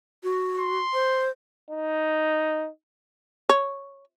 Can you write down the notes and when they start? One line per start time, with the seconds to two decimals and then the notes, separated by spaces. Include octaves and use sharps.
0.23 F#4
0.57 C6
0.94 C5
1.70 D#4
3.49 C#5